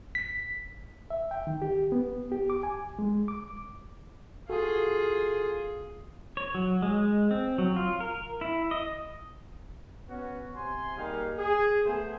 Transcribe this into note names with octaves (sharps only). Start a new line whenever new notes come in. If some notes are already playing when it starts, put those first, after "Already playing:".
B6
E5
G5
D#3
G4
B3
G4
D6
G#5
G#3
D6
F4 F#4 G#4 A4
C#5
F#3
G#3
C4
F#3
F4
A#4
E4
D#5
B3 C#4 F#4
C3 G#5 C6
G3 A#3 D#4 G4 G#4 F5
G#4
A3 B3 G#4 C5 G#5